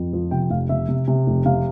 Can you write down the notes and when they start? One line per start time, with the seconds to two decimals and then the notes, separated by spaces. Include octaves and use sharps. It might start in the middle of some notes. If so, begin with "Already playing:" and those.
Already playing: F2
0.13 F3
0.31 C3 G5
0.50 F1 F5
0.69 C3 E5
0.89 C3
1.08 C3
1.27 F1
1.46 C3 F5